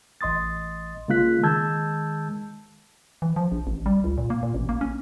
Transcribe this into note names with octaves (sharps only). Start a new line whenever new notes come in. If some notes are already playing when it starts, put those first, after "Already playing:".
A1 D#5 C6 D#6 A6
C#3 G#3 A#3 F4 F#6 B6
D#3 G#3 A5 E6 G6 G#6
E3
F3
A#1
A1
G3
C#2
A#2
A#3
A#2
A1
A#3
C#4